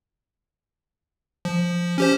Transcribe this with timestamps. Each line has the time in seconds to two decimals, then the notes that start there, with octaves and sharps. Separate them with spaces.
1.45 F3
1.98 C#4 G4 C5